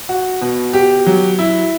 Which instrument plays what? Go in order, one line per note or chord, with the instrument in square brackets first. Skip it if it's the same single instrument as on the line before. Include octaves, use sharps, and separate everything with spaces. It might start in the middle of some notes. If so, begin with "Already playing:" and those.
[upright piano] F#4
B2
G4
F#3
E4